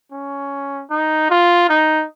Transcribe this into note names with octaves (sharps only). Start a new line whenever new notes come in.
C#4
D#4
F4
D#4